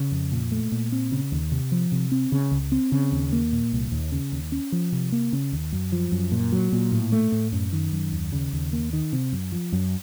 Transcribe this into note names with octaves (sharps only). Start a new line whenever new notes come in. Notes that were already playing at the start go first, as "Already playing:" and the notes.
Already playing: C#3
F2
A#2
A3
A#2
C4
C#3
D#2
C3
F3
C3
C4
C#3
C#2
C4
C#3
D#2
A#3
A#2
C2
D#2
C#3
D#2
C#4
F3
C3
A#3
C#3
D#2
F#2
F3
F#2
A#2
F#3
A#2
A2
A3
A2
F#2
D#3
F#2
D#2
C#3
D#2
A#3
D#3
C3
F#2
F3
F#2